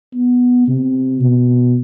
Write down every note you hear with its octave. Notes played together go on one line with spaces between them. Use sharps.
B3
C3
B2